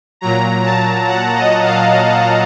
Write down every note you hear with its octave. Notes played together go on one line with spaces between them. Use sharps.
A#2 F#3 A#5
A5
F#5
D#5
F5
D#5